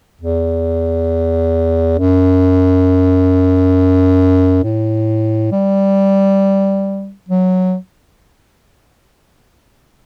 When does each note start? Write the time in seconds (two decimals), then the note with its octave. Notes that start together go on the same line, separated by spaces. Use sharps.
0.21 E2
1.99 F#2
4.64 A2
5.52 G3
7.29 F#3